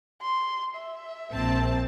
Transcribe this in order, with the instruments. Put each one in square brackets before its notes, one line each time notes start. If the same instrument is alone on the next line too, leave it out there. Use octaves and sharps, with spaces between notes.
[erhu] C6
E5
[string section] A#1 C4 A5